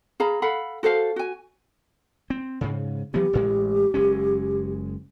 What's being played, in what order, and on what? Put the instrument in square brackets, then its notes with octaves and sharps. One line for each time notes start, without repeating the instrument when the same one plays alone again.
[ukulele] G#4 F5 A#5 B5
A4 F5 F#5 B5
F#4 A4 C5 F5
F#4 G#5
[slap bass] C4
G#2 C#3
[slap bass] E3 F#3 B3 [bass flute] G4
[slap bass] A1 A2 G#3
F#1 G#3 C#4